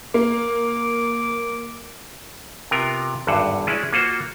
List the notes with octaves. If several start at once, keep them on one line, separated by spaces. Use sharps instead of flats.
A#3 D6
C3 B3 F4 A#4
G#1 E2 G2 D3 C5 F#5
G#3 C#4 E4 G#4 D5
A#3 F4 F#4 C5